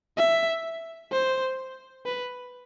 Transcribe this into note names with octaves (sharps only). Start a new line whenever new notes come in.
E5
C5
B4